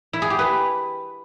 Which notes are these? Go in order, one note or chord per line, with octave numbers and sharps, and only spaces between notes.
E4
G#4
G4
B4